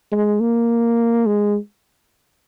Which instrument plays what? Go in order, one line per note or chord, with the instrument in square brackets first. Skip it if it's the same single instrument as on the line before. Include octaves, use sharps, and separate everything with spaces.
[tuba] G#3
A#3
G#3